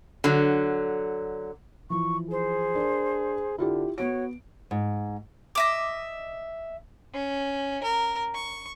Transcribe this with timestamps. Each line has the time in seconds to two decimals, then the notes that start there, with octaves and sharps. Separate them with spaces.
0.24 D3 F#3
1.90 E3 F3 C#6
2.31 G#4 C5
2.75 D4 A#4
3.58 D3 E4 F4 G4
3.98 B3 F#4 C#5 D7
4.71 G#2
5.55 D#5 E5 D6
7.14 C#4
7.83 A#4
8.35 C#6